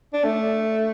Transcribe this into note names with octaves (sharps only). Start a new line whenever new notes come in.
D4
A3